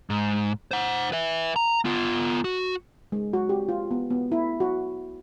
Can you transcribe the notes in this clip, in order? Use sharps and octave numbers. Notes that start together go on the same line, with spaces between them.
G#2
C5 F#5
B4 E5
A#5
B3 F4
F#4
G#3
F#4
G4
F4
B3
B3
E4
F#4